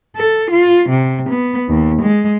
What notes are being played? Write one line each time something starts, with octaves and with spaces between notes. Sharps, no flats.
A4
F4
C3
B3
D#2
G#3